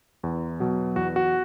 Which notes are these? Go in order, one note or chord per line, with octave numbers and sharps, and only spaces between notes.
E2
B2 F#3
E2 F#4
F#4